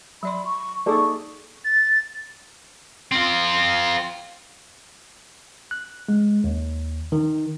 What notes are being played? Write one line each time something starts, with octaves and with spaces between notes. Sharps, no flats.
F#3 D5 B5 C6
C#6
A#3 D#4 G#4 A4 D5 C#6
A6
C4 F4
F#6
G#3
D#2
D#3